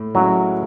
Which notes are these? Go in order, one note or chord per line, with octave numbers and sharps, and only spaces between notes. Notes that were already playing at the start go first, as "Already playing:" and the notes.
Already playing: A2
F#3 G#3 C#4 E4